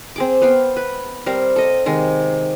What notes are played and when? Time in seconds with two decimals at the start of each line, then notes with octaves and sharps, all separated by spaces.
0.16 C4 G#4 D6
0.41 B3 F5 G5
0.77 B4
1.26 G3 C4 A#4 F5
1.56 A4 D#5
1.86 C3 D#3 G#3